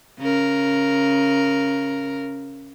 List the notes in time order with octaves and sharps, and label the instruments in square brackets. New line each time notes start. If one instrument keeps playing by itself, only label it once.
[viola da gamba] C#3 A#4